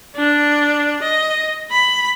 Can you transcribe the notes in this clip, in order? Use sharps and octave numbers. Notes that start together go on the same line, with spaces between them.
D4
D#5
B5